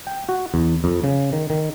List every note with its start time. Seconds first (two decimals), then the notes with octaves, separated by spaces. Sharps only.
0.07 G5
0.29 F#4
0.54 E2
0.84 F2
1.04 C#3
1.33 D#3
1.50 D#3